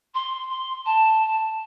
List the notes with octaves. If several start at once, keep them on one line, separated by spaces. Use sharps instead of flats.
C6
C6
A5